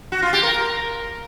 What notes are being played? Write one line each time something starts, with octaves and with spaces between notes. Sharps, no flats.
F#4
F4
G4
A#4